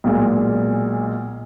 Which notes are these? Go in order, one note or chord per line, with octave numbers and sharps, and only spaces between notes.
B1 A#2 G#3